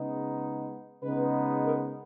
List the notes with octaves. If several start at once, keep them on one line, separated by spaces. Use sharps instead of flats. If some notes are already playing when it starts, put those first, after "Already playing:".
Already playing: C#3 G#3 B3 D#4
C#3 G#3 B3 D#4 B4
A#4